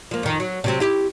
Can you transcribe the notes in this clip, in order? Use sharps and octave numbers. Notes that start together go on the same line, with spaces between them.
F3 A#3
F2 D#3
F#3
C3 F#3 C4
E4 G4